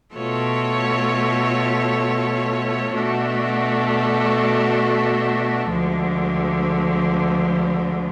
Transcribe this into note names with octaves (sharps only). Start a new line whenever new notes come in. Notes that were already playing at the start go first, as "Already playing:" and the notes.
B2 A3 F4 A4 C#5
B2 A3 D4 F#4 A4
D2 D3 F3 G#3